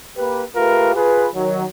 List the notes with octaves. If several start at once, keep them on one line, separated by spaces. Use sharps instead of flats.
A#3 G4 B4
A3 F4 G4 A#4 B4
F4 G#4 B4
D#3 F#3